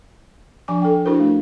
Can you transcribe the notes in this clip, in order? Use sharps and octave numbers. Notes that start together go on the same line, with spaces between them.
F3 D4 G#5 D6
A4 G5
D4 E4 F#4 A#4 C5
A3